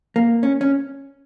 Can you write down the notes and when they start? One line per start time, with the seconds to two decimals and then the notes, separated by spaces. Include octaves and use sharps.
0.16 A#3
0.43 C#4
0.61 C#4